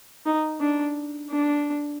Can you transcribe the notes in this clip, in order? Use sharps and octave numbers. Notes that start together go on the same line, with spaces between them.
D#4
D4
D4